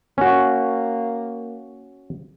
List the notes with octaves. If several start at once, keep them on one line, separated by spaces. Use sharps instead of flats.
A#3 C#4 F#4